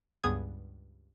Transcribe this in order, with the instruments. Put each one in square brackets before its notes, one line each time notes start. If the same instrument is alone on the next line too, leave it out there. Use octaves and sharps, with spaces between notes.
[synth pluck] C#2 G2 B3 G#4 D#6 G#6